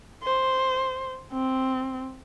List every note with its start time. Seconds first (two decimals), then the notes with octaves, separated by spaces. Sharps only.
0.23 C5
1.33 C4